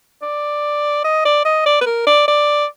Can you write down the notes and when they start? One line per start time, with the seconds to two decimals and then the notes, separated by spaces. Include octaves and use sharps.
0.22 D5
1.04 D#5
1.25 D5
1.45 D#5
1.66 D5
1.81 B4
1.86 A#4
2.07 D5
2.28 D5